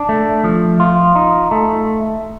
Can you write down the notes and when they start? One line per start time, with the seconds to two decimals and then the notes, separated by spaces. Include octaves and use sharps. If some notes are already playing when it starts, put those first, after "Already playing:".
Already playing: D4
0.09 A3
0.44 F3
0.80 F4
1.15 D#4
1.51 A3